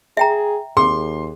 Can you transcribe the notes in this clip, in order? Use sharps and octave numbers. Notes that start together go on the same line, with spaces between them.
G#4 E5 G5 A#5
D#2 G#4 C6